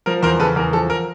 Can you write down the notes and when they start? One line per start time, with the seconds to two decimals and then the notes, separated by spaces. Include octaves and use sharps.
0.06 F3 A#4
0.22 E2 A#4 C5
0.39 C#3 A4 B4
0.56 E2 A#4
0.73 F3 A4
0.90 A#4